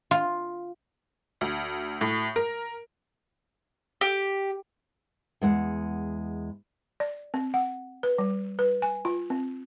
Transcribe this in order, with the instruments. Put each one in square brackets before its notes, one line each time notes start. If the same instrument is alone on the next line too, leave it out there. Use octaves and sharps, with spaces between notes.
[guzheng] F4
[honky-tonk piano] D2
A2
A#4
[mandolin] G4
[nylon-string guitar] E2 G#3 F#5
[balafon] D5
C4
F#5
B4
G3
B4
G#5
F4
C4